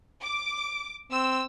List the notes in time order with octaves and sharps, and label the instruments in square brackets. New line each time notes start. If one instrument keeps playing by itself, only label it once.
[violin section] D6
[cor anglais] C4 [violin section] E6